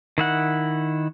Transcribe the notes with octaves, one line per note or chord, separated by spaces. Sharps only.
D#3 E4 F#5